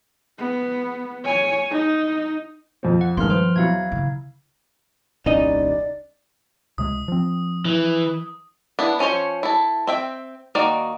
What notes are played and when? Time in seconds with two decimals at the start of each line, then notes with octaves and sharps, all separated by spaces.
0.39 B3
1.25 C#5 G#5
1.71 D#4
2.83 F2 F3 C4
3.01 F#5
3.17 G2 D#3 F3 G#3 C6 F6
3.30 B3 C5
3.56 E2 F#3 E4 F5 G#6
3.92 C#3
5.26 D#1 C2 C#4 D#4 D5 D#5
6.78 C#2 C3 G#3 D#6
7.08 F3 C4
7.65 E3
8.79 B3 D4 E4
8.99 F3 C#4 E4 C5 C#5
9.43 E4 A4
9.87 C4 E5 G5
10.55 D#3 A#3 F#4 D5